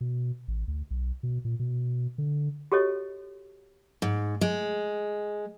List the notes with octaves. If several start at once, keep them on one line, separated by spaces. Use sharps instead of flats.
B2
A1
D2
B1
B2
A#2
B2
D3
F#4 G4 A4 C#5 D#5
G#2
G#3